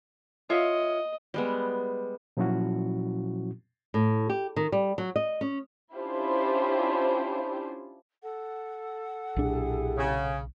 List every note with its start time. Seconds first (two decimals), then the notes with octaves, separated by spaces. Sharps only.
0.50 F4 C#5 D#5 E5
1.34 G3 G#3 B3
2.37 A#2 F3 F#3 C#4 E4 F#4
3.94 A2
4.30 G4
4.56 D#3
4.72 G3
4.98 F#3
5.16 D#5
5.41 C#4
5.95 C#4 D4 E4 F4 G4 C5
8.23 A4 F#5
9.36 B1 A#2 D4 E4 G4 G#4
9.97 C#3